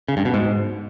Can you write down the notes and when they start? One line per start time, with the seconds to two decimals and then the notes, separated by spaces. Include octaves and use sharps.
0.08 C#3
0.17 G2
0.25 B2
0.34 G#2